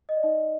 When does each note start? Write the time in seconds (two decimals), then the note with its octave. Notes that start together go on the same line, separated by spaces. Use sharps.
0.09 D#5
0.16 D5
0.23 D#4 D#5